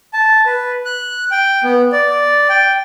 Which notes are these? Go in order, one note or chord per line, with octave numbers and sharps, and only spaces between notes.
A5
B4
F#6
G5
B3
D5
G5